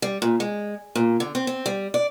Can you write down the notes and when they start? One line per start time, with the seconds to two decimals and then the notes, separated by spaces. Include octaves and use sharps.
0.02 G3
0.22 A#2
0.40 G#3
0.95 A#2
1.20 D3
1.35 C4
1.47 C4
1.66 G3
1.94 D5